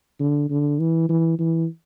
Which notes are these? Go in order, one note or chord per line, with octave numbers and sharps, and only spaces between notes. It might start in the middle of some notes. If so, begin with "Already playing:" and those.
D3
D3
E3
E3
E3